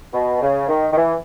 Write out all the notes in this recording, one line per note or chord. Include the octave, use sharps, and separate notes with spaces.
B2
C#3
D#3
D#3
E3